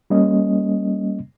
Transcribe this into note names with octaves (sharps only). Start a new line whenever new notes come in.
G3 A#3 C#4 D#5